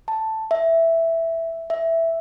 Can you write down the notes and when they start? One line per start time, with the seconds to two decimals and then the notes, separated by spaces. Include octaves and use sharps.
0.08 A5
0.51 E5
1.70 E5